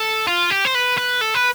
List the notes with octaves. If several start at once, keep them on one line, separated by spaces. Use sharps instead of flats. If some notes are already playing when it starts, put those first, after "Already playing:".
Already playing: A4
F4
G4
C5
B4
B4
A4
B4